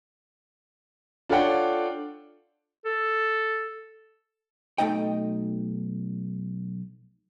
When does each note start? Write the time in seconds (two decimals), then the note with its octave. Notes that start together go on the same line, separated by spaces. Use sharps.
1.29 D4 F4 A4 C#5 F#5 G5
2.85 A4
4.78 B1 A3 D#4 D#5 G5